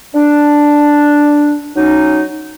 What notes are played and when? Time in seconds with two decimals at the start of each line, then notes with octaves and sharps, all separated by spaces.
0.15 D4
1.77 F#3 C#4 D#4